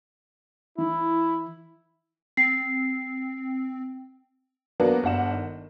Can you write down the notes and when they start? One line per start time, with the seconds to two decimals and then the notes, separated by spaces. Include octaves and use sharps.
0.78 E3 E4
2.37 C4 C7
4.80 F#3 A#3 B3 D4 F#4
5.03 G1 D4 F#5 E7
5.32 D#3